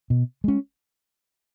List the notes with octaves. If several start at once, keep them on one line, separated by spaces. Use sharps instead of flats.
B2
G#3 C#4